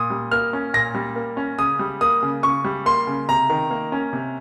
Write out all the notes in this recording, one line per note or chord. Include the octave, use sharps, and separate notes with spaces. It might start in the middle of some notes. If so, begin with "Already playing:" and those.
Already playing: A#2 D#6
G3
A#3 F6
C#4
A#2 A#6
G3
A#3
C#4
C#3 D#6
G3
A#3 D#6
C#3
C#3 C#6
G3
A#3 C6
C#3
C3 A#5
D#3
A#3
C#4
C3